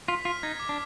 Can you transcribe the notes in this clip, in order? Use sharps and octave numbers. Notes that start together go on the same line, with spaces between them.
F4 B6
F4 F6
D#4 G#6
D6
D4